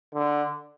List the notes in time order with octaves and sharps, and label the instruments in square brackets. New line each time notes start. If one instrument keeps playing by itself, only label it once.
[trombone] D3